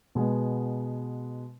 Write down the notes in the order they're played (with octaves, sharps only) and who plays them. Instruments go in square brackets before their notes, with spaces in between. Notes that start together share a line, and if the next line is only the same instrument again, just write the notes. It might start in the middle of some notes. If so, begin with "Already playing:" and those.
[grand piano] B2 G#3 B3